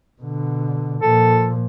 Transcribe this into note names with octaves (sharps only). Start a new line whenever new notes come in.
B2 D3
A#2 F3 A4